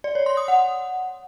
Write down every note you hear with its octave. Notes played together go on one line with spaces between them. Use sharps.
D5
C#5
C6
D#6
F#5